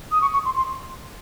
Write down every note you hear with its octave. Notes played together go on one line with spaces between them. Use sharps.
D#6
C#6
C#6
C6
C6